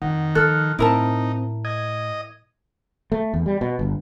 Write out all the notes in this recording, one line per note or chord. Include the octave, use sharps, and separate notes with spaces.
F2 D#3 F#5
F3 A4 F6 F#6
A2 C4 D#4 E4 A#4 A5
D#5 G#6
A3
E2
G3
B2
G1